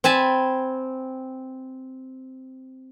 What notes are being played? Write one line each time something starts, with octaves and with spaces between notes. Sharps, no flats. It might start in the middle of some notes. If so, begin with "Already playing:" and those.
C4 G#5 A5 B5